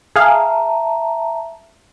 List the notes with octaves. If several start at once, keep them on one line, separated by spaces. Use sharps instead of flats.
G#4 E5 F5 A5 A#5